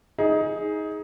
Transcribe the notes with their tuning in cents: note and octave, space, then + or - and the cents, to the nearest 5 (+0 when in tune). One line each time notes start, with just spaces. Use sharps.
D#4 +20 G#4 +0